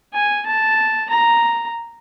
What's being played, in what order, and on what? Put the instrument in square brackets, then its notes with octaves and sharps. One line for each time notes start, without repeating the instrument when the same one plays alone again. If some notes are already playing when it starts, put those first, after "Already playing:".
[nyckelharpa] G#5
A5
A#5